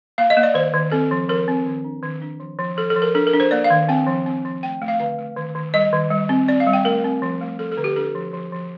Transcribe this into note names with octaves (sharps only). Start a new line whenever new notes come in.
A#3 F5
D#5
A#3
D5
D#3 C5
D#3
C4 A4
F3
F3 A#4
C4
D#3
D4
D#3
D4
F3
F3
F3 A4
A4
F3
A#4
D4 A4
A#4
D4
C5
A#3 D5
F5
D#3
C4 G5
F3
C4
F3
A3 G5
A3
F5
D3 F5
A3
D#3
D#3
G3 D#5
D#3
G3
C4
C4 D5
F5
G3
G5
A3 A#4
C4
F3
A3
F3 A4
A4
D3
G4
D4 A4
F3
F3
F3